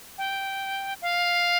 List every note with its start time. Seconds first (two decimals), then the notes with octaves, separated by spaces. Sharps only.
0.18 G5
1.02 F5